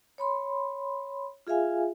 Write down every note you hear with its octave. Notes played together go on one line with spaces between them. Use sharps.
C#5 B5 C6
F4 G#4 E5 F5 G#5